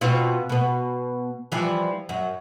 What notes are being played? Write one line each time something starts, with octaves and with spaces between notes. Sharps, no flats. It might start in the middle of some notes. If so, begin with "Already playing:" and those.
B2 C4 F4
B2 B3
E3 F3 G3
F#2